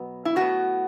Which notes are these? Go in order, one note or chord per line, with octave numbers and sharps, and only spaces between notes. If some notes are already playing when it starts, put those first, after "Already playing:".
Already playing: B2 F#3 B3
E4
A2 F#3 B3 F#4